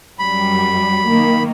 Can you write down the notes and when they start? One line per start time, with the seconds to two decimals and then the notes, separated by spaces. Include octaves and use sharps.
0.19 F#2 F#3 G3 B5
1.10 D#3 A#3